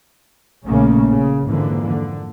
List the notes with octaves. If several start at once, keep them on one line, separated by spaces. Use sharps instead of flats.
A#1 C#3 A3 A#3 C#4
C#3
F2 G#2 D3 E3 A#3
D3